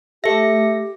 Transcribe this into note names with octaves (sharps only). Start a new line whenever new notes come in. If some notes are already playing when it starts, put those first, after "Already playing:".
A3 G4 E5 A#6 C#7